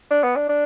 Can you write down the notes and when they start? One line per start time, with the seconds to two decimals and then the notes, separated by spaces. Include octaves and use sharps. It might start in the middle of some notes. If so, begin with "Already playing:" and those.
0.10 D4
0.23 B3
0.36 D4
0.49 D4